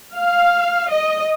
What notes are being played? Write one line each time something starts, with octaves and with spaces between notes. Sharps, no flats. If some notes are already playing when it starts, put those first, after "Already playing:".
F5
D#5